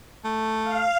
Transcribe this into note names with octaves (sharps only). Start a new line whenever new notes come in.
A3
F5